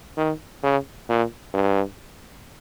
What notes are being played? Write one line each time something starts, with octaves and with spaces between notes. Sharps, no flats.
D#3
C#3
A#2
G2